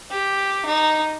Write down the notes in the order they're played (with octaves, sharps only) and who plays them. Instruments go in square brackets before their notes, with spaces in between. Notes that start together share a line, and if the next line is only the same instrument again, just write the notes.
[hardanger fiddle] G4
D#4